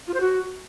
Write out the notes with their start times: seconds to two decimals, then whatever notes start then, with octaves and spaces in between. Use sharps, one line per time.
0.07 F4
0.14 C5
0.20 F#4